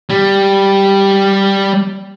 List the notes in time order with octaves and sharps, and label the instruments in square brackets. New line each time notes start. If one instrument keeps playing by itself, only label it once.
[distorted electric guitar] G3